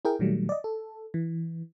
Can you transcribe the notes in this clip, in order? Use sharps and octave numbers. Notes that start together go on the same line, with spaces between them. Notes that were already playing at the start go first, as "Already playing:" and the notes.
E4 G#4 A#4 G5
A#2 D#3 F#3 G3 A3
D5 D#5
A4
E3